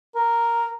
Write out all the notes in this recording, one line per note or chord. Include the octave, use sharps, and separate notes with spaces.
A#4